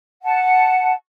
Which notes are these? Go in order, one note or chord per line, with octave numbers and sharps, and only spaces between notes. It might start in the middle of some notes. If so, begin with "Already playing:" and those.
F#5 A5